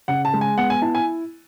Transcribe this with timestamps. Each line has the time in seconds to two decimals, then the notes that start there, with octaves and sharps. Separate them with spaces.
0.08 C#3 F#5
0.25 A5
0.34 G#3
0.41 G#5
0.58 B3 F#5
0.70 G#5
0.82 E4 A5
0.95 G#5